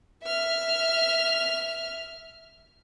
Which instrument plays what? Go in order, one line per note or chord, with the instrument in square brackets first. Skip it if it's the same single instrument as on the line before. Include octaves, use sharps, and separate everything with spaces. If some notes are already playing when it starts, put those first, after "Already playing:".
[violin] E5 F6